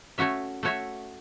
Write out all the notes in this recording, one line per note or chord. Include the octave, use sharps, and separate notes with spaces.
A3 C#4 F#4 C#5 E5
A3 F#4 C#5 E5